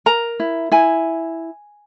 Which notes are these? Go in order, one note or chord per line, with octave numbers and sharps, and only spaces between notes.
A#4 A#5
E4
E4 G#5